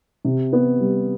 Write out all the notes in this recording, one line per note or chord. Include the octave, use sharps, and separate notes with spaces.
C3
B3
G3